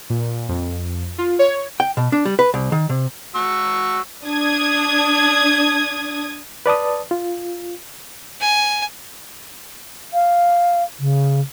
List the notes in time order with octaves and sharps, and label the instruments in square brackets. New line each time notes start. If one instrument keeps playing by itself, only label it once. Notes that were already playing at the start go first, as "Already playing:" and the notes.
[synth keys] A#2
F2
F4
C#5
[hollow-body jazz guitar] G5
B2
D4
G3
B4
C2
D#3
C3
[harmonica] F#4 C#6 E6
[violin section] D4 D#6 G#6
[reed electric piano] B4 D5 A5 D#6
F4
[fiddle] G#5
[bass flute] F5
C#3